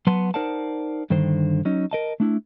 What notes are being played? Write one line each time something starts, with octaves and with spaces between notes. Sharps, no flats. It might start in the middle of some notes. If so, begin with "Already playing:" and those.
F#3 B3 B4 F#5 A5 C6
D#4 A#4 C5 D5 F#5 A5
G2 D3 D#3 C5
F#3 C#4 D#4
A#4 D#5 A5
A3 D4 E4